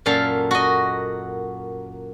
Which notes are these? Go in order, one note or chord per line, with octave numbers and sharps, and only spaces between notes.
F#2 A#2 A4 F5
F#4 D#5